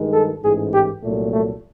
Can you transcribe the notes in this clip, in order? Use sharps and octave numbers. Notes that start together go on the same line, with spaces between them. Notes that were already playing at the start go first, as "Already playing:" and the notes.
Already playing: G2 D#3 G#3
A4
A1 G#2 E3 G#4
G4
C2 A#2 F#3 A3
A3